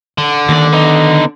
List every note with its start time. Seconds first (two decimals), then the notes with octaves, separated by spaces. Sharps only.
0.18 D3
0.49 D#2 D#3 D5
0.73 B3 D#4